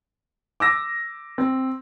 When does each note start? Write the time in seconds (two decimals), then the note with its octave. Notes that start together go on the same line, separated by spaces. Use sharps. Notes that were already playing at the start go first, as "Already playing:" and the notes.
0.60 D6 E6 A#6
1.38 C4